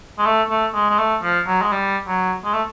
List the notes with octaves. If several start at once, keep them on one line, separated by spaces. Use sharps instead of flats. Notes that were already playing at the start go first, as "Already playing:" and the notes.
G#3
A3
A3
G#3
G#3
A3
F3
F#3
G#3
G3
F#3
G#3
A3